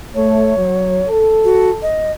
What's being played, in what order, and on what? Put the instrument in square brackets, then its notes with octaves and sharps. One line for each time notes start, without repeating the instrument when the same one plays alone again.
[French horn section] A3 [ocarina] C#5
[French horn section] F#3
A4
[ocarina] F#4
D#5